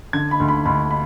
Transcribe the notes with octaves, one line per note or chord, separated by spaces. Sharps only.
D3 G#6
B5
D2
B5
D2 B5
B5